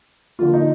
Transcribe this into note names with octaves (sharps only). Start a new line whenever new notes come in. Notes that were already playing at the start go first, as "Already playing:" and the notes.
D3 F3 A#3 F4
D#4